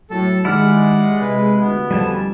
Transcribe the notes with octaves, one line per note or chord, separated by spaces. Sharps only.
A2 F#3 A4
D#3 G#3 E4 G4 D5 F#5 F6
C3 B4
D2 B3
F2 G3 G#5 A5